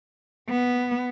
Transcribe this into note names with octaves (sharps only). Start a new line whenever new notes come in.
B3